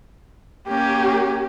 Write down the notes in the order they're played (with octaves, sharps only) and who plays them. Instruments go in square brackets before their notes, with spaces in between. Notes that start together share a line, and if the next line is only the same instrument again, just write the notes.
[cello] A#3 C#4 [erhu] G4